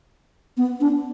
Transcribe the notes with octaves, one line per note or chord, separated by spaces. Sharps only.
B3
D4